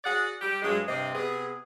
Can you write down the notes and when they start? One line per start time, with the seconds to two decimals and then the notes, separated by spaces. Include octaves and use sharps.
0.04 F#4 G#4 D5 F#5
0.41 G3 G4
0.62 G2 F#3 G#3
0.88 G2 C3 C4 D5 D#5
1.15 C3 B3 G#4